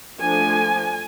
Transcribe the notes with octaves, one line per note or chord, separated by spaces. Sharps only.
F3 A3 D4 G#5